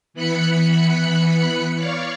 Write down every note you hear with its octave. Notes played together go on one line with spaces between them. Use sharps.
E3 B3 B5 F#6 C#7
C#5 D5 F5 C#6